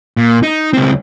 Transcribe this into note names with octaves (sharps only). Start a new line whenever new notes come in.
A#2
D#4
C#2 C4